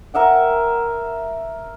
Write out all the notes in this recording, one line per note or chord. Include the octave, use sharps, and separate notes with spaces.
A#4 E5 F#5 G5